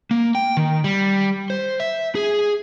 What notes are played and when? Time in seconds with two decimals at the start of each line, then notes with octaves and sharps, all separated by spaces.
0.11 A#3
0.35 G5
0.57 D#3
0.84 G3
1.50 C5
1.80 E5
2.15 G#4